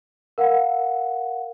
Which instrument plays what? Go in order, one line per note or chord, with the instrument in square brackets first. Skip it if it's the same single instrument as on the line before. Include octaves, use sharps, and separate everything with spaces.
[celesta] A#4 F5 F#5